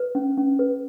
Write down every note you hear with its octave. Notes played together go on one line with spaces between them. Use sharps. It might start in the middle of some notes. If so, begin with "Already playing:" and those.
Already playing: B4
C#4
C#4
B4